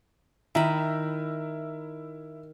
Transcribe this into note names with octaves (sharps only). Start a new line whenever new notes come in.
D#3 E4 E5 A#5 B5